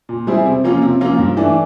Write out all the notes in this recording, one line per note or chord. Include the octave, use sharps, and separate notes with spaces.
A#2
G3 C4 E4 G#4
C3
F3 A#3 C#4 F4
C3
F3 A#3 C#4 F4
G2
E3 A3 D4